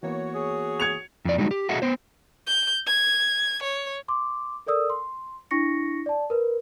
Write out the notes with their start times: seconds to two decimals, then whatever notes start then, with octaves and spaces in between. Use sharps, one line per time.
0.03 E3 A#3 B3 F#4 C#5
0.35 G#4
0.80 G#6 C#7 F7
1.25 F2 D5
1.38 G3 G#3 D#4 F#4
1.51 G4
1.69 F#4 G#4 A4 D#5 E5 F#5
1.82 B3 C5
2.47 G6
2.87 G#6
3.63 C#5
4.08 C6 D6
4.67 A4 A#4 D5 D#6 E6
4.90 C6
5.51 D4 E4 C#6 A#6 C#7
6.06 D5 A5
6.30 A#4 B4